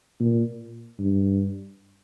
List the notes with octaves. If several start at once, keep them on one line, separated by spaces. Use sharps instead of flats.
A#2
G2